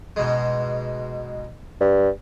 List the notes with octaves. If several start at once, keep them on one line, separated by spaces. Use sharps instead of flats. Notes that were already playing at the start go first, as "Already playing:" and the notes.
G#2 B2 G#3
G2